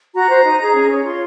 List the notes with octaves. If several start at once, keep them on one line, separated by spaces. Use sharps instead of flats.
F#4 A#5
C5
D#4
G#4
C#4
C#5
F4 C6